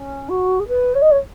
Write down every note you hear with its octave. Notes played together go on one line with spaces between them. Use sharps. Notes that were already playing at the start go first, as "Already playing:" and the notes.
Already playing: C#4
F#4
G#4
B4
C#5
D#5
C#5